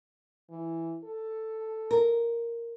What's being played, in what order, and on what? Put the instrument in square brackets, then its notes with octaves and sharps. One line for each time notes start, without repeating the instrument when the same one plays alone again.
[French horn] E3
A4
[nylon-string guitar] A#4